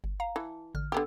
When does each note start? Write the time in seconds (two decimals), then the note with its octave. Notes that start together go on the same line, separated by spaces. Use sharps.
0.04 G1
0.20 F5 A#5
0.36 E3 A5
0.75 A1 D3 F6
0.92 D3 B3 G4 E6